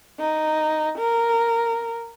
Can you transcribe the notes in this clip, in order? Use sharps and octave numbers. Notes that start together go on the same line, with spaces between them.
D#4
A#4